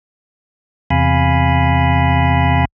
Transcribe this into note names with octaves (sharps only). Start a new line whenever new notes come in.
E2 C3 F5 G#5 B5